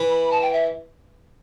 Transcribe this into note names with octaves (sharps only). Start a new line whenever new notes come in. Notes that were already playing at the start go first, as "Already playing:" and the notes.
Already playing: E3
B5
A5
G5
E5